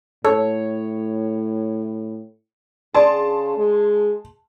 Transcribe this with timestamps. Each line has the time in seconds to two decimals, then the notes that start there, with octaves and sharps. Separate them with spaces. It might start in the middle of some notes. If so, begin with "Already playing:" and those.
0.25 A2 A4 C#5
2.94 C#3 G#4 D5 A5 C6
3.57 G#3